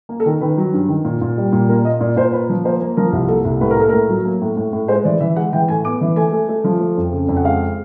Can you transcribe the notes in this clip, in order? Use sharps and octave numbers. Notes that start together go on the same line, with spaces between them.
A#3
A4
D#3 A#4
D#3 B4
F#3
G2
D#3
A#2
A#2
G3
A#2
A#3 A#4
A#3 D#5
A#2 D5
A#2 C5
A#3 B4
F3
A#3 C5
A#3
F3 A#4
C2
A#3 A4
C2
A2 B4
A#4
A#3 A4
A2 A#4
F#3
A#3
A2
A2
A2
G#3 C5
E3 D5
E3 E5
G#3 F#5
E3 G5
A2 G#5
B3 D6
E3
A3 G#5
A3
A3
F3
A3
F2
C#3
F2
F#5
G#3 F5